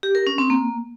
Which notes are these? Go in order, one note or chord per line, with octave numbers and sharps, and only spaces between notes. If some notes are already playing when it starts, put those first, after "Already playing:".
G4
A#4
C#4
C4
A#3